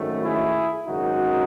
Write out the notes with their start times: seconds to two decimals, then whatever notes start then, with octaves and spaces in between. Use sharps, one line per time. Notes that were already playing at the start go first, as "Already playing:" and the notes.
Already playing: G#1 F#2 D#3 A3
0.23 E4 G#4
0.87 G#1 F#2 C#3 G#3 D#4 F#4